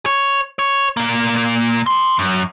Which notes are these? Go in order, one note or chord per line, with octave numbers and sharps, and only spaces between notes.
C#5
C#5
A#2 A#3
A5 C6
F#2